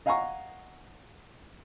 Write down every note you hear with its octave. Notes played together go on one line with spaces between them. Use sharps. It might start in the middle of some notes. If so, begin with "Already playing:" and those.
D#5 F5 F#5 G#5 A#5 C#6